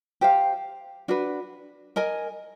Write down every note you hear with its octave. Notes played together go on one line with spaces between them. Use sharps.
G4 C5 F5
D4 F#4 B4
A#4 D#5 G#5